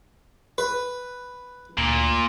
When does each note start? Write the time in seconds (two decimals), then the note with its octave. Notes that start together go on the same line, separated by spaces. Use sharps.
0.58 B4
1.78 D2 A#2